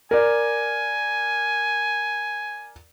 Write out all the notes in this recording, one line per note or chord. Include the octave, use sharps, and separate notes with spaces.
A#4 D5 G#5